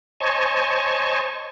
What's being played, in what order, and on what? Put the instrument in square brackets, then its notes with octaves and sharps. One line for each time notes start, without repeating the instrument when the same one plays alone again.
[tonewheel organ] C5 C#5 D#5 G#5 A5 C#6